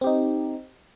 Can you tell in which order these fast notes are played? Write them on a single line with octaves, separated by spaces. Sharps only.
C4 G4 D#4